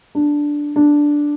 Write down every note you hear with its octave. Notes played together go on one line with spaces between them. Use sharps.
D4
D4